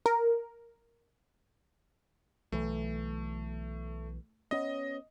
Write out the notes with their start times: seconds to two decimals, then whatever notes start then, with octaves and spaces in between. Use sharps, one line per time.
0.06 A#4
2.52 B1 E3 A3
4.51 B3 C#4 D#5